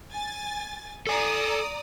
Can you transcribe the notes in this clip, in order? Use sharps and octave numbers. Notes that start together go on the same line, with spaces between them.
G#5 A6
A4 D5 G#5 A#5 D#6